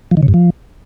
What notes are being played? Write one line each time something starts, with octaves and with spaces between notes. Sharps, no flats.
F3
D#3
C#3
G2
F3